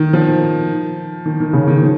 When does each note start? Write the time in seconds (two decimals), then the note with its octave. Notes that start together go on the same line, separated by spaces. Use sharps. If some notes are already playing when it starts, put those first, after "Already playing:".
Already playing: D#3
0.13 F3
1.26 D#3
1.40 D#3
1.53 C#3
1.68 D#3
1.82 F3